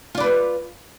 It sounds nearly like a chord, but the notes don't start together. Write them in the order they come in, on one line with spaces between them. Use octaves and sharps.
F4 D5 B4